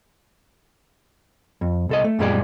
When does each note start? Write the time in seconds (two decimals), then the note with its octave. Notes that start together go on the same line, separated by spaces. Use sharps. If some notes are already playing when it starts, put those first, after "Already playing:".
1.61 F2
1.89 C2 A4 D#5
2.04 A3
2.19 F#2 A#2 G3 G#3 G#4 D5